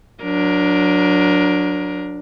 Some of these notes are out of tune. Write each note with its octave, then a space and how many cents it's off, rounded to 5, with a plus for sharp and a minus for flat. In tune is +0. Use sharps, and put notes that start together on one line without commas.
F#3 -25 D4 +0 A#4 +20